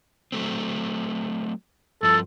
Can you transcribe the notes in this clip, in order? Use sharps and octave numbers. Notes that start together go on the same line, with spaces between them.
F#3 A3 C4
G2 F3 A4